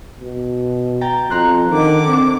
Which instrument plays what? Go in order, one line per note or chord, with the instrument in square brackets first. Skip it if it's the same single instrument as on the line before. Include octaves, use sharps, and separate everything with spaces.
[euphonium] B2
[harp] G5 A#5 A6
[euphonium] F2 [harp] A#5 C6 F#6
[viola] D3 D6 [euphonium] D#3
[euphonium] C4